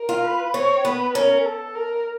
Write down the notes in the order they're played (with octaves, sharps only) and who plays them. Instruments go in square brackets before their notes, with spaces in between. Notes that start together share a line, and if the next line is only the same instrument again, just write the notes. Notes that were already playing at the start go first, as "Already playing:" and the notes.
Already playing: [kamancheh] A#4
[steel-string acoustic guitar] F4
[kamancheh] B4
[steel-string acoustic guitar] C4 [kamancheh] C#5
[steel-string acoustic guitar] B3 [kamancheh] B4
[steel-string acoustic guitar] C#4 [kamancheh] A#4
[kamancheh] A4
A#4